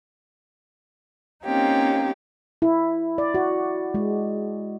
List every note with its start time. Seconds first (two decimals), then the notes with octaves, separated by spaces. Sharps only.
1.44 A#3 C4 C#4 D#4 F4 G4
2.62 E4
3.18 D5
3.34 F#4
3.94 G#3